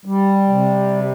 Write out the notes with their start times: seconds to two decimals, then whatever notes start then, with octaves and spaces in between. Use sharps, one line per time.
0.05 G3
0.49 C3